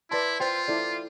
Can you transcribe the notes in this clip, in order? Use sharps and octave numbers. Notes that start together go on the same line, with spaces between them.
E4 B4 D5 A5 C6
F4 C5 G5 C6
E4 A4 D5